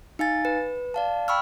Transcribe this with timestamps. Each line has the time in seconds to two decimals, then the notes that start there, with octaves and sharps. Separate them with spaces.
0.19 D#4 F5 G#5 A6
0.45 B4
0.94 D5 F5 A5
1.28 G5 B5 C#6 E6 F6